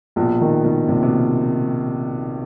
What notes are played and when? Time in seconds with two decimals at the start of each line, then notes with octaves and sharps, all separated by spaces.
0.16 A#1 B2
0.41 D#3
0.64 B2 D#3
0.88 A#1 C3
1.03 C3
1.07 B2